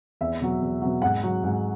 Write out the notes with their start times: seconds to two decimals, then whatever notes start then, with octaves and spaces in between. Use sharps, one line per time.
0.21 E2 E5
0.41 B2 F#3
0.62 E2
0.81 B2 F#3
1.02 G#2 F#5
1.23 F#3
1.44 G#2